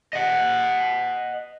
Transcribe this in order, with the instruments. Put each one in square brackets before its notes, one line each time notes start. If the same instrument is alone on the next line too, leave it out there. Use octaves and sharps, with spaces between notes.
[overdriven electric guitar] D#5 F#5